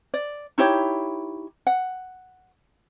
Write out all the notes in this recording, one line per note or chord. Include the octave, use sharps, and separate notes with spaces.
D5
D#4 E4 G4 C#5
F#5